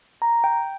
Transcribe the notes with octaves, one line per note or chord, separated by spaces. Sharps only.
A#5
G5